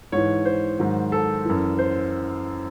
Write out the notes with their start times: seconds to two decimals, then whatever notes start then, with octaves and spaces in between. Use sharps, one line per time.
0.12 G#2 E3 C#5
0.45 C5
0.79 G#2 D#3 F#3
1.12 A4
1.45 F#2 E3
1.79 C5